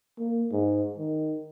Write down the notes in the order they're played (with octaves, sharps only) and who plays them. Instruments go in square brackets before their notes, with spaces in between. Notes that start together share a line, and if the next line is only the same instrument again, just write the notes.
[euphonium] A#3
G#2
D#3